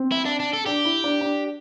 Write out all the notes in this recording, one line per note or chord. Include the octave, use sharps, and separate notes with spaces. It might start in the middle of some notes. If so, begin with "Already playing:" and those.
Already playing: C4
E4
D4
D4
A4
D4 G4
E4
D4
D4